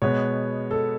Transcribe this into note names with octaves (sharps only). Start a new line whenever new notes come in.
B2 G#3 B3 C#5
A4